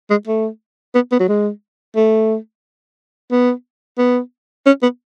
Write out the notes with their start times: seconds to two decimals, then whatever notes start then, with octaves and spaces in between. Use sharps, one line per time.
0.10 G#3
0.27 A3
0.95 B3
1.12 B3
1.20 F#3
1.28 G#3
1.96 A3
3.31 B3
3.98 B3
4.66 C#4
4.82 B3